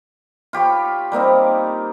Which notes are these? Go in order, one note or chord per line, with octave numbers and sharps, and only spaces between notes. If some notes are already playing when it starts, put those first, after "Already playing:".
F4 G4 C#5 B5
G3 A#3 C4 D#4